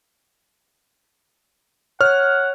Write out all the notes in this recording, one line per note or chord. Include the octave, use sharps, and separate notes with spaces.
C#5 F#5 F6